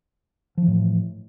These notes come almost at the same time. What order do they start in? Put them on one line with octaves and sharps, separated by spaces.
F3 E3 A2